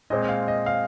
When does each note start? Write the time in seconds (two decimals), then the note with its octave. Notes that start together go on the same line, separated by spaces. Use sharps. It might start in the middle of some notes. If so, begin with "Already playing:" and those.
0.10 A#2 G#3 C4 D#5
0.29 F5
0.48 D#5
0.66 F5